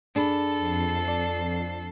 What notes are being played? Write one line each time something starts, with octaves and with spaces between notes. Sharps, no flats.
F#2 D4 G#4 A4 B5
F2 C7
D5